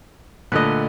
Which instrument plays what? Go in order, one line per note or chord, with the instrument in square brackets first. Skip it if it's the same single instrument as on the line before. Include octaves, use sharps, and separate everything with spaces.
[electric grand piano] A#2 D3 A3 [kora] B4 D#5